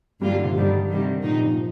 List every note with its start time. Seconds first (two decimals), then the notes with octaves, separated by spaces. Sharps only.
0.21 G2 D3 F3 G3 A#3 F4
0.38 D3
0.45 C3
0.53 G2 D3 D#3 G3
0.89 C3 D#3 G3
1.22 A#2 D#3 F3 A#3 D#4
1.34 D#3
1.45 F3